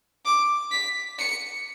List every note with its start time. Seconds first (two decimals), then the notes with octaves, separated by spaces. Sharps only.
0.25 D6
0.71 B6
1.19 C#7